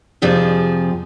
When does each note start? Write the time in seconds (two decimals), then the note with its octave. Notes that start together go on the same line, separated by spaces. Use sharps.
0.22 F2 C3 F3 G#4